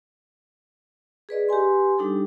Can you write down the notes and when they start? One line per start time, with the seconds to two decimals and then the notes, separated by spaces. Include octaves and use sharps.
1.29 G#4 B4 D5 D#5
1.49 G4 B4 G#5 C6
1.98 G3 D4 D#4 G4 A4